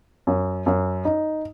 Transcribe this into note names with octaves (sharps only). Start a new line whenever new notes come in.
F#2
F#2
D#4